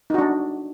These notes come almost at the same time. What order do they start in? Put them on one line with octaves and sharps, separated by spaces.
D#4 F#4 D4